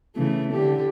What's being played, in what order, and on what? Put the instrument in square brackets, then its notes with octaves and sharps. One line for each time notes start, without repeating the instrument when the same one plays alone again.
[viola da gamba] C#3 E3 A3
D3 G4